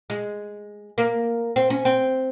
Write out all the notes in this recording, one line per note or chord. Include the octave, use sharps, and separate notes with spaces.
G#3
A#3
C4
C#4
C4